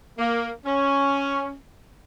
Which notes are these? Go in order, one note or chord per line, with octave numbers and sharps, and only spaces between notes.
A#3
C#4